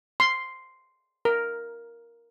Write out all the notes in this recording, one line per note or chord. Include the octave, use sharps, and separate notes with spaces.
C6
A#4